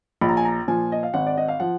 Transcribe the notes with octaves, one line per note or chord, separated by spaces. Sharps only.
A#1 B5
A#5
G#5
A#5
A#2 F3 G#5
D#5
F5
G#1 F#5
D5
D#5
F5
F3 F#5